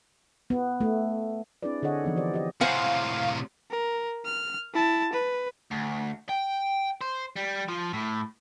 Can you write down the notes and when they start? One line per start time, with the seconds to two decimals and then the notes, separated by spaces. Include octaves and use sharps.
0.50 B3
0.80 A3
1.63 C4 D4 E4 G#4 B4 D5
1.82 D3 G#4 A4 C#5 D#5 F#5
2.04 E3 F3 B3 D#4
2.16 G4 C5 D5
2.33 G4 D#5
2.61 A2 C3 C5 F5 F#5 G#5
3.71 A#4
4.25 F6
4.74 E4 A5
5.13 B4
5.71 D2
6.29 G5
7.01 C5
7.36 G3
7.69 F3
7.93 A2